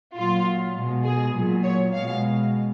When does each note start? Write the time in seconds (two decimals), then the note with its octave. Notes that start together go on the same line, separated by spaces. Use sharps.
0.15 A#2 F#3 F4
0.74 B2 G#3
1.04 G#4
1.34 A#2 F#3
1.63 C#5
1.93 B2 G#3 F5